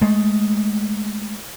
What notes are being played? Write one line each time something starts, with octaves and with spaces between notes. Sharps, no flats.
G#3 A3